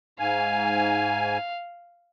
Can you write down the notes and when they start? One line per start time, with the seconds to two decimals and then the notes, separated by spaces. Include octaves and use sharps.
0.19 G#2 F5 G#5